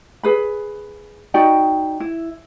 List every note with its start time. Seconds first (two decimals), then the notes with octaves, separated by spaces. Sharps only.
0.23 G#4 B4 B5
1.34 D#4 F#4 D5 G5
2.00 E4